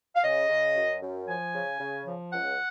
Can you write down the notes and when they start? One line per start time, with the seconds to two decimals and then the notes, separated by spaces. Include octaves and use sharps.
0.16 F5
0.23 C#3 D#5
0.49 C#3
0.76 F#2
1.02 F#2
1.28 F3 G#5
1.54 C#3
1.80 C#3
2.07 F3
2.33 C#2 F#5